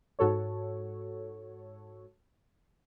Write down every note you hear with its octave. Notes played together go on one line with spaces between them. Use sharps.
G#2 F#4 A4 C#5